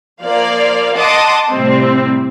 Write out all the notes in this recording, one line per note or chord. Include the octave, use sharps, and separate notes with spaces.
F3 A#3 D5 F5
D#5 F#5 A5 C6 D6 D#6
A2 C3 G3 C4